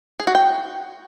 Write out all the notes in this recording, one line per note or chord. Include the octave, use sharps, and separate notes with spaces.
G#4
F#4
G5